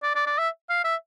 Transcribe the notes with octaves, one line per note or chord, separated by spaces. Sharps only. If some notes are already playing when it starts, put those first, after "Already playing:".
D5
D5
D5
E5
F5
E5